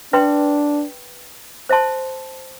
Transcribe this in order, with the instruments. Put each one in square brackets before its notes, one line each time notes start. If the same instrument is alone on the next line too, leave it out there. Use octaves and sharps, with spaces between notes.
[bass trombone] D4 [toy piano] B4 E5 G5 C6
[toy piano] C5 E5 A5 C6